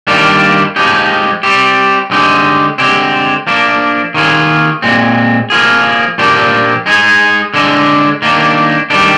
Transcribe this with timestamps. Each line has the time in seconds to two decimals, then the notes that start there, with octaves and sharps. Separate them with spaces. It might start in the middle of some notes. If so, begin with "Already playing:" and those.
0.07 D#3 G3 A#3 D4 F4
0.76 F3 G#3 D#4 G4
1.43 G3 C4 G4
2.11 D3 G#3 D#4 G4
2.78 D3 G#3 C4 G4
3.47 F3 A#3 D4
4.14 D#3 A#3 F4 G#4
4.82 A#2 G#3 C4
5.50 F3 A#3 F4 G#4
6.18 A#2 F3 A#3 D4 G4
6.86 G#3 D#4 G#4
7.54 D3 G#3 D4
8.22 D#3 A#3 D4
8.90 D#3 G3 D4 G4